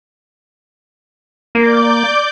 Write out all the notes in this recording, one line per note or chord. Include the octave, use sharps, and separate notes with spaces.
A#3 D5 D6 G6